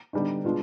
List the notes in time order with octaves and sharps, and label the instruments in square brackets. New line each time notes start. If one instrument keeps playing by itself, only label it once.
[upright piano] D3 G3 B3 D#4
B2 G#3 D4 F4